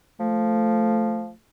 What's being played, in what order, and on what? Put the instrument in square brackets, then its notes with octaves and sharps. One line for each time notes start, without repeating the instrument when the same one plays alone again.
[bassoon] F3 [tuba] A3